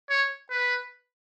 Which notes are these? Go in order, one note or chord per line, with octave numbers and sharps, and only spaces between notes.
C#5
B4